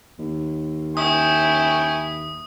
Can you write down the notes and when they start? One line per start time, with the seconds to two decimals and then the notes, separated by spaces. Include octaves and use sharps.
0.19 D#2
0.97 E4 G5 G#5 C#6 D#6